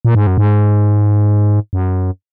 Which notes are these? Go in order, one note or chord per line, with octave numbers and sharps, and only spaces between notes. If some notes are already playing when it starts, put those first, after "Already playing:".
A#2
G#2
F#2
G#2
F#2